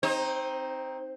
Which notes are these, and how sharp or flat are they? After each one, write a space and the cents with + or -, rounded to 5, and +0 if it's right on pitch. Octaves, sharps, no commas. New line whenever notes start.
C4 +0 D#4 +0 C5 +40